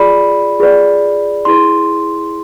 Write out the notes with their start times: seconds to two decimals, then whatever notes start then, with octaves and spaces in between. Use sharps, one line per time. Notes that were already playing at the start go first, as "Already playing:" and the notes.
Already playing: F4 G#4 D5 B5
0.60 F4 G#4 B4 D5
1.45 E4 G#4 B4 C6